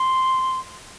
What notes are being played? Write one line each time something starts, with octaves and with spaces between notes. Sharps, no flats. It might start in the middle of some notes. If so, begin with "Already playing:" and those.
Already playing: C6